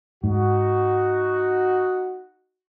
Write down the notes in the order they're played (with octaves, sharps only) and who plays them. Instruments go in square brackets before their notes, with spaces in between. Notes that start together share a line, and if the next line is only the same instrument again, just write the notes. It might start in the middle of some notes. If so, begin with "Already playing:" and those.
[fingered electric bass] G#2 [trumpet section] D#4 F#4